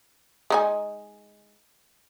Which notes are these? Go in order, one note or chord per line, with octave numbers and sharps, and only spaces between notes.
G#3 D#4 G#5